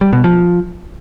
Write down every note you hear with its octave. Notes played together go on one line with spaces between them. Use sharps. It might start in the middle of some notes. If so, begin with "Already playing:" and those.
G3
B2
F3